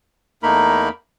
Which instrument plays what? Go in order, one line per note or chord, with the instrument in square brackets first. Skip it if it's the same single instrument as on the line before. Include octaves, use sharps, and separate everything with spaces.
[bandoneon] E2 A3 A#3 D#4 A#4 B5